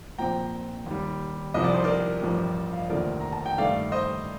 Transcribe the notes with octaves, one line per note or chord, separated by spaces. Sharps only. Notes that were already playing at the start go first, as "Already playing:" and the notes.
A#1 A#2 F3 C4 G5 A#5
D#2 D#3 G3
C2 C3 F3 D#5
D5
C5
A#4 D5
A1 G2 F3
F5
D#5
F1 D#2 D3 F3 A3 A#4 D5
A#5
A5
G5
G2 D#3 A3 D5 F5
C5 D#5